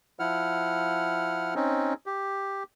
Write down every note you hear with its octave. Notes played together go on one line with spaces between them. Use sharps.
F3 E4 F#5 F6
C4 C#4 D#4
G4